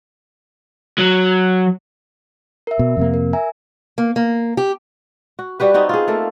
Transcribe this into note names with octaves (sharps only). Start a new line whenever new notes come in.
F#3
A#4 E5
B2
F2 C3 A#3
A#4
E5 G#5 A#5
A#3
A#3
G4
F#4
G3 F#4 G4 B4
B3 C4 D#4 F#4
F4 G#4
A3 A#3 A4